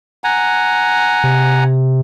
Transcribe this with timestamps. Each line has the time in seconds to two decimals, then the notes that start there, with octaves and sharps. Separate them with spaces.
0.24 F#5 G#5 A#5
1.24 C3